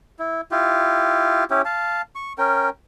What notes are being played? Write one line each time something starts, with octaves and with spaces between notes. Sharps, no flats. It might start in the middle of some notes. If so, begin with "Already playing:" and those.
E4
E4 F4 G4
C#4 E4 G4
F5 A5
C#6
C#4 A#4 G5